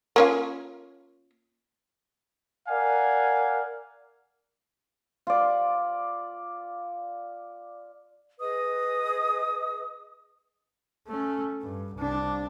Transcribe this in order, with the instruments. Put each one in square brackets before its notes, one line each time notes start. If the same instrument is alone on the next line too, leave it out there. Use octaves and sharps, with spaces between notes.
[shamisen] A#3 C#4 F4
[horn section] A#4 D5 F5 F#5 G#5
[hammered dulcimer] F4 D5
[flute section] G#4 B4 D#5 D#6
[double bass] A3 C#4
G2
C2 D4